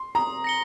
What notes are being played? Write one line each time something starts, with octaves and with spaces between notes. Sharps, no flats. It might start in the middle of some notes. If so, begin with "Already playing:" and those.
Already playing: C6
A#5 D#6
A#6 C#7 G7